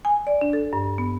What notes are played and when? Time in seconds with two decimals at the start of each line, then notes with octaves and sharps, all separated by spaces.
0.05 G#5
0.27 D5
0.41 D4
0.53 A4
0.73 G2
0.98 B3